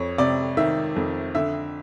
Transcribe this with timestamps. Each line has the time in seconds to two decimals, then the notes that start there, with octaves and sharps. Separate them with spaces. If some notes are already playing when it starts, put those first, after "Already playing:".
Already playing: F2 C#5
0.18 C3 D5
0.57 D#3 E5
0.96 F2
1.35 D3 E5